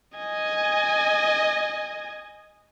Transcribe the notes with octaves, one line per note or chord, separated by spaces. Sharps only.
D#5 G#5